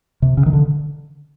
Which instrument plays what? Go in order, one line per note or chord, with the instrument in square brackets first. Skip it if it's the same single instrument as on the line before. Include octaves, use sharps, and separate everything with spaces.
[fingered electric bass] C3
C#3
D#3
D3